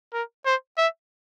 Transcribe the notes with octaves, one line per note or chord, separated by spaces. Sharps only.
A#4
C5
E5